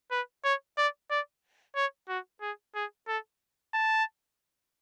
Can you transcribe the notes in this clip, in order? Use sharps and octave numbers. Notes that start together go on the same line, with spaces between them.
B4
C#5
D5
D5
C#5
F#4
G#4
G#4
A4
A5